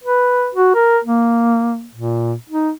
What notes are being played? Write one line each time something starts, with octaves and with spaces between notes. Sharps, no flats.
B4
F#4
A#4
A#3
A#2
D#4